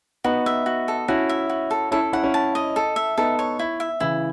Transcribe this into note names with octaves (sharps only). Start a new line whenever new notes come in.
B3 D#4 F#4
E5
F#4
A4
C#4 E4 F#4
E5
F#4
A4
C#4 E4 A4
C#4 E4 F#5
C#4 E4
A5
D#5
A4
E5
B3 D#4 A4
C#5
E4
E5
C#3 E3 E4